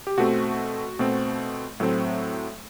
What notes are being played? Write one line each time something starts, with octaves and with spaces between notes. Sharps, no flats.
G4
B2 A3 C4 F#4
B2 A3 C4
A2 F#3 A3 C4